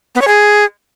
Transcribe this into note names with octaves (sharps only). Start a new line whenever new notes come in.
B3
C#5
G#4